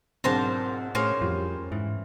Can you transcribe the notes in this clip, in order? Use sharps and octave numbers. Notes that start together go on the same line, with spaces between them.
B1 G#2 C4 D4 F4 A#4 C5 A5
A2 A#3 C#4 G#4 C5 C#5
F2 G3 F4
G#2 E3